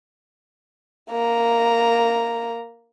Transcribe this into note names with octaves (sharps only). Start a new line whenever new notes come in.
A#3 A#5